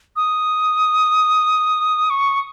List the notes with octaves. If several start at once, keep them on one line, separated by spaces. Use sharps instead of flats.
D#6
C#6